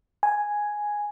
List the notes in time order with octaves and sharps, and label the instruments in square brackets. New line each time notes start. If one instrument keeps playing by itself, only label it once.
[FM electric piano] G#5